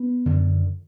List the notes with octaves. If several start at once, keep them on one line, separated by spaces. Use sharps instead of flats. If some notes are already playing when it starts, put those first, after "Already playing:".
Already playing: B3
F#2 D3